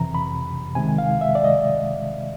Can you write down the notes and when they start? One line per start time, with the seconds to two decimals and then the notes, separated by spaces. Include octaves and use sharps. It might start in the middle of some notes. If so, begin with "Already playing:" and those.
Already playing: F2 C3 E3 A#5
0.15 B5
0.75 C#2 C3 D#3 G#3 G#5
0.98 F5
1.21 E5
1.35 D5
1.44 D#5